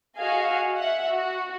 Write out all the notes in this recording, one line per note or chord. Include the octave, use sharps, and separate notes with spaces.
F#4 G#4 D#5 F5 G#5
E5 F#5
F#4